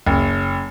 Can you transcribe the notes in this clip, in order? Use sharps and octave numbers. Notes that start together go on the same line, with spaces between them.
F#1